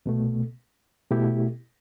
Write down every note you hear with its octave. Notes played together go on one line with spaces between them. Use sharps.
C2 B2 A3
B2 A3 E4 G4